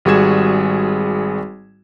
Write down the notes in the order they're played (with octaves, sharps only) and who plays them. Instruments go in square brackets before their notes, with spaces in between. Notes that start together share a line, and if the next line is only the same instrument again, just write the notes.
[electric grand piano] G#1 G3 F#4 G#4 G#6 E7